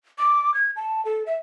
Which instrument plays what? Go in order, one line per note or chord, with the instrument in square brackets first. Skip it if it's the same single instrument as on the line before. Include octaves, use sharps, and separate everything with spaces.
[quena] D6
G#6
A5
A4
E5